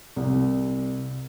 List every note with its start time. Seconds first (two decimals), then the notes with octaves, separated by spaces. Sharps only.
0.16 C2